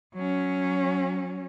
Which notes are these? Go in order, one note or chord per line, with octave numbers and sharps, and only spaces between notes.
F#3 C#4